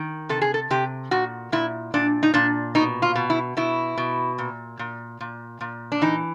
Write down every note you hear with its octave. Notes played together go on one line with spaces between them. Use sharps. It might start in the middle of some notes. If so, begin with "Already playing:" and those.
Already playing: D#3
C3 A4
G#4
A4
C3 G4
A#2 F#4
A#2 E4
A#2 D4
D#4
A#2 D4
B2 D#4
F4
B2
E4
B2 E4
B2
A#2
A#2
A#2
A#2
D4
E3 D#4